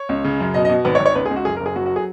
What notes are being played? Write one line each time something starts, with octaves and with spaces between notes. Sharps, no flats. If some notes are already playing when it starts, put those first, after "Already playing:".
Already playing: C#5
C#2
C#3
F#2
B2 D#5
D#5
B2
G#1 B4
C#5
G#1
C#5
C#2 B4
G#4
C#2
F#4
F#1 G#4
A#4
F#1
G#4
F#3 F#4
F#4
G#4